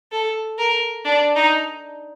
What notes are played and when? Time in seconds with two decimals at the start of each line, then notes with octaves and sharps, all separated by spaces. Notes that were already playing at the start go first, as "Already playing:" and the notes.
0.12 A4
0.59 A#4
1.05 D4
1.36 D#4